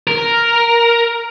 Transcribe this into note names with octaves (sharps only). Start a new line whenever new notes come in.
A#4